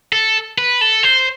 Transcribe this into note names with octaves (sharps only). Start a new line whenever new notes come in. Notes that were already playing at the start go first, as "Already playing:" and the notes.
A4
B4
A4
C5